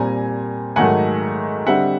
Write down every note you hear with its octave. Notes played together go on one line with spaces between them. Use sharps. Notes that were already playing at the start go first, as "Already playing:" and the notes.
Already playing: A#2 G3 C4 G#5 A#5
G#2 D#3 F#3 A3 F#5 G#5
D3 G3 C4 E5 F#5